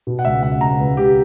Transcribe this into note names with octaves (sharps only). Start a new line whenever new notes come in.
B2
F#5
C#2 E5
C#2 F#5
C#2 A#5
C#2 B4
C#2 G4